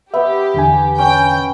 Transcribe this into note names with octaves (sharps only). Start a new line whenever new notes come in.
B3 G4 E5
E2 D3 G#5
C#4 G5